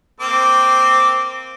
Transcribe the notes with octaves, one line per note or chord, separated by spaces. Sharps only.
A#3 C4 D6